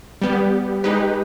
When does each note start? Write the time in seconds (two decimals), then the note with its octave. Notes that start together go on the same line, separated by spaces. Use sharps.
0.22 G3 B3 G4
0.84 G#3 D#4 G4 B4